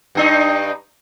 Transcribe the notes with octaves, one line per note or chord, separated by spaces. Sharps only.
G2 D4 D#4